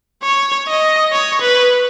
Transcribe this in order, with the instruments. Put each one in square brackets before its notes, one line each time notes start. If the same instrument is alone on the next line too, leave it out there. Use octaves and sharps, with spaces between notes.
[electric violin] C#5
D#5
C#5
B4